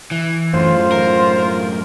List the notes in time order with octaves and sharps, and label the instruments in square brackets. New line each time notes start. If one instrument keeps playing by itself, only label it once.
[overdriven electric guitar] E3
[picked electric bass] F#2 A2 [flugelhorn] F4 [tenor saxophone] C5
[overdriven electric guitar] A#4